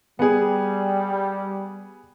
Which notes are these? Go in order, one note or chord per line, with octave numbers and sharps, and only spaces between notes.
G3 B3 G#4